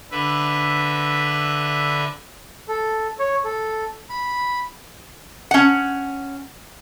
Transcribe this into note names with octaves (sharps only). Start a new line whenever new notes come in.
D3 B4 E5
A4
C#5
A4
B5
C#4 F#5